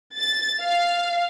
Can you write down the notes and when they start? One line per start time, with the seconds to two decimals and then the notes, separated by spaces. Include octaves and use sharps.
0.18 A6
0.61 F5